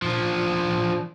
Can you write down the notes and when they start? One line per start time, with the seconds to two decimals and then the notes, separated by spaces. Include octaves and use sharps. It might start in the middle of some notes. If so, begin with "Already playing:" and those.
0.02 F3 D4